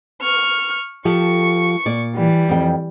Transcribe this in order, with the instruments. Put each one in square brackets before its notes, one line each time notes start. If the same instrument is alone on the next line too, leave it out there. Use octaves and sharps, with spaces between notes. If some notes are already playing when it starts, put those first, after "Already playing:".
[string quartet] C#6 F6
[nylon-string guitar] F3 G4 A4 [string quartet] C#6
[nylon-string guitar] A#2 D5
[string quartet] E3 G3
[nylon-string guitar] F2 G5